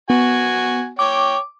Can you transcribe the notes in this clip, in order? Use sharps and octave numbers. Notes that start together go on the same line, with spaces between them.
B3 F#4 G#5
C#5 G5 D6